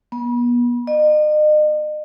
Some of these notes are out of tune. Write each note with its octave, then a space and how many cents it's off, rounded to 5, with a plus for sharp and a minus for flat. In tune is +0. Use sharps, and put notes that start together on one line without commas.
B3 -35
D#5 -40